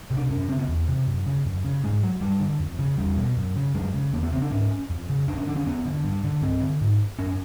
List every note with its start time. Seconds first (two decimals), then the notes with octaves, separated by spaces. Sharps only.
0.11 C3
0.17 D4
0.30 F#2 C#4
0.40 C#4
0.49 C#3 C4
0.59 B3
0.68 E2
0.88 C3
1.07 F#2
1.27 C#3
1.46 F#2
1.65 C#3
1.84 G#2 G#3
2.03 F#3
2.21 G2 G3
2.40 D3
2.60 F2
2.79 C#3
2.98 E2 G3
3.17 B2
3.37 F#2
3.56 C#3
3.74 F#2 G#3
3.94 C#3
4.13 E2 A#3
4.23 B3
4.32 C#3 C4
4.42 D4
4.51 G#2 C#4
4.90 F2
5.09 C#3
5.28 F2 D4
5.38 C#4
5.47 D3 D4
5.56 C#4
5.66 F2 B3
5.85 D3
6.04 G2
6.24 D3
6.42 G2 C4
6.61 D3
6.81 G#2
7.19 F#2 C#4
7.29 C#4